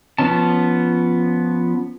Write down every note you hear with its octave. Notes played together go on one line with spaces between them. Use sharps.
F3 B3 C#4 A5